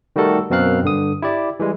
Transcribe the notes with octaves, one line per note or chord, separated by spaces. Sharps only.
D#3 G3 A3 F#4 A4 A#4
F#2 B2 C4 A#4 F5 F#6
G2 D3 D#6
E4 G4 D5
E3 G3 G#3